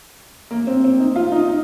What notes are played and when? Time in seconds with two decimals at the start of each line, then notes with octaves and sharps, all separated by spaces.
0.51 A#3
0.67 C4
0.84 C4
1.00 D#4
1.16 F4
1.32 D#4
1.48 D#4